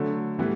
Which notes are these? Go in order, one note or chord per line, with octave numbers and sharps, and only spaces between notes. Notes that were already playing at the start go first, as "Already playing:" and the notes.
Already playing: D3 F#3 A3
A2 E3 G3 B3